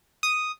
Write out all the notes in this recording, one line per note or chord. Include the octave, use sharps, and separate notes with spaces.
D#6